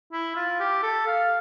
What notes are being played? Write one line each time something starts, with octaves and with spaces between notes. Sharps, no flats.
E4
F4
G4
A4
F5